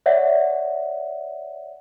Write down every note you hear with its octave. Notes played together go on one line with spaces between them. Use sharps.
C#5 D5 E5 F#5